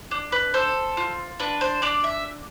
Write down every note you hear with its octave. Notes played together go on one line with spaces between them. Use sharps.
D4
B4
A4 C5
F4
D4 B4
C5
D4 D5
E5